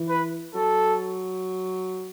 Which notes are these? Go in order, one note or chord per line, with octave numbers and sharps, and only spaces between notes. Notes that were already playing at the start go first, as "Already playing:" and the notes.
Already playing: E3
B4
F#3 A4